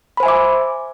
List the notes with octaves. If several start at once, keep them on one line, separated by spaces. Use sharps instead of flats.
C5 E5 G#5 B5 D6